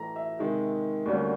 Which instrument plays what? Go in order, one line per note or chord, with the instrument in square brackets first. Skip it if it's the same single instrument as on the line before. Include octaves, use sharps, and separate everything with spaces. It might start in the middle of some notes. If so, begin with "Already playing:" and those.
Already playing: [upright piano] A2 E3 A3 A#5
E5
C3 D#3 G#3
D2 D3 G3 A#3 C#4